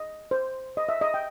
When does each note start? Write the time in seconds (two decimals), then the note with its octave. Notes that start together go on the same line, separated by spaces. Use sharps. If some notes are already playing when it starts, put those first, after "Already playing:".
Already playing: D#5
0.31 C5
0.77 D#5
0.89 E5
1.01 D#5
1.14 G5